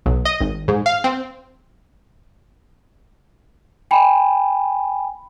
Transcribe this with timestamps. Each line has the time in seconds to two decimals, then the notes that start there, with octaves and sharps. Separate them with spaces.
0.06 B1
0.25 D#5
0.40 G#1
0.68 G#2
0.86 F5
1.04 C4
3.91 G5 G#5 B5